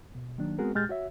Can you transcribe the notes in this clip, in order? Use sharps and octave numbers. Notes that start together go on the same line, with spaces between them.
B2
D#3 F#3 A#3 D4
G#3 B3 C4 F#4 G#4 A#4
A#2 G#3 G4 F6 G6 A6
F#4 C#5 E5